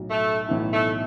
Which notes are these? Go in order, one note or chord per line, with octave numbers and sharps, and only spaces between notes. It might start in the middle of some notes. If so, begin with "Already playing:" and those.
Already playing: B1 A2 F#3
A3
B1 A2 E3 B3 E4
A3